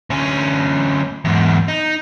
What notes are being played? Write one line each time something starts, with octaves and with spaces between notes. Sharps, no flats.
D2 C#4
E2 G#2
D#4